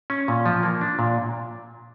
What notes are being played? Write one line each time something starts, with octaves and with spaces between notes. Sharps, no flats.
C#4
A#2
F3
A#3
D4
A#2